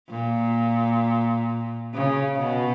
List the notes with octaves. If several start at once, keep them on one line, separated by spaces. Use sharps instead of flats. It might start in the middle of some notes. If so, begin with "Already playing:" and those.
A#2
C#3
B2